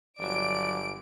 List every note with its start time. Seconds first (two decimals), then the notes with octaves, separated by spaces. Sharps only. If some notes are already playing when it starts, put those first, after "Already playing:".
0.19 G1 F3 F#3 D5 D7